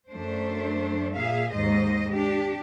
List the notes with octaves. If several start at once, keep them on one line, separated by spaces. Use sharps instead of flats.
F#2 A3 D4 C5
A#2 G#4 E5 F5
D#2 G#2 C5 D#5
D4 G4